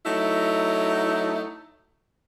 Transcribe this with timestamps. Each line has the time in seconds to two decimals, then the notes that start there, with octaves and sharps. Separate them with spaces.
0.05 F#3 A3 D#4 E4